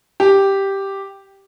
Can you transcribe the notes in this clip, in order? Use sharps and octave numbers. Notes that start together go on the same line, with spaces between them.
G4